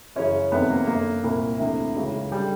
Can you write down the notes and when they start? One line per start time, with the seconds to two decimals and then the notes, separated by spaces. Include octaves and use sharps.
0.16 F#2 C#3 E3 C#4
0.52 F2 C3 D#3 B3
0.70 A#3
0.87 F#2 D3 A#3
1.24 C2 A#2
1.59 D2 C3 E3
1.96 C#2 C#3 E3
2.32 D3 G3